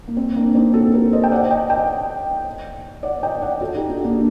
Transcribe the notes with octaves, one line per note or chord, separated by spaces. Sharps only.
A#3
C4
A#3 D4
C4 D#4
F#4 A4
G4 A#4
C5 D#5
G5
D5 F#5
D#5 G5
D#5 G5
D5 F#5
D#5 G5
D5 F#5
F#4 A4
D#4 G4
D4 F#4
A#3 D4